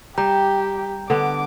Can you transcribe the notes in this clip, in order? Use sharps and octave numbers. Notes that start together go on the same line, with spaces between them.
G3 G4 G5 A#5 G6
D3 B3 D6